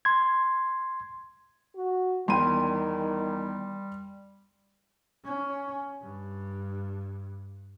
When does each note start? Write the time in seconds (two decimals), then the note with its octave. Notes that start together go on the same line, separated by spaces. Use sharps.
0.05 C6 G#6
1.76 F#4
2.28 E2 D#3 G3 G5 B5 C6 D#7
5.25 C#4
6.02 G2